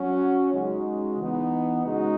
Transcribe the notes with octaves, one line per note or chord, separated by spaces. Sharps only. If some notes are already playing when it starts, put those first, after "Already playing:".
Already playing: F#3 C#4 F#4
C#3 G#3 D#4 F#4
E3 B3 D#4
C#3 G#3 D#4 F#4